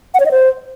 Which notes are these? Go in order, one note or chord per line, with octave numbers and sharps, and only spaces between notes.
F#5
C#5
D#5
C5